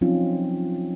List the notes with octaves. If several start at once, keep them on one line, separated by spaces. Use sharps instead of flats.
F3 F#3 C4 C#4 D#4 F4